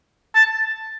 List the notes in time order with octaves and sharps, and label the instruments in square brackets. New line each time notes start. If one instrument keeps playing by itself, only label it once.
[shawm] A5